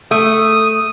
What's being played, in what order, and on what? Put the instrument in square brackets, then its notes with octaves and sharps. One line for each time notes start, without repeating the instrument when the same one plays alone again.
[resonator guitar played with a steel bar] A3 [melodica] D#6